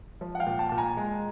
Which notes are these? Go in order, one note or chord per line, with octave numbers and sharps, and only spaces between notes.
F3
F#5
F5 G5
A#2
G5 A5
A#2 A5
G#5 A#5
G#3